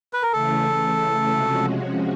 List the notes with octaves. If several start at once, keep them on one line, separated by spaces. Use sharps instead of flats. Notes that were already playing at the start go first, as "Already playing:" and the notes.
B4
A#4
C#3 E3 A3 A4
C3 F3 G#3 C#4 F#4